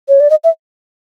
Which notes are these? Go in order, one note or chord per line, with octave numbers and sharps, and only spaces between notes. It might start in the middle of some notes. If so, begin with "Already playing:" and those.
C#5
D5
D#5
E5